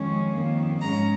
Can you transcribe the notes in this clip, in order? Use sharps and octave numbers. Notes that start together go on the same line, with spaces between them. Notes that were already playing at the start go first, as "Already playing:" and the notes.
Already playing: F2 D#3 G#3 C#4
F2 D#3 A#3
G#2 G#3 C#4 A#5